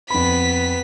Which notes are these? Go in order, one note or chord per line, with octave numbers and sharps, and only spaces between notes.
F2 B3 B5 B6